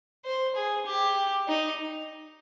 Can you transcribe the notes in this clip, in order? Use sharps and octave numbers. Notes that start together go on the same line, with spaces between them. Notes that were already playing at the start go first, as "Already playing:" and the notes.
C5
G#4
G4
D#4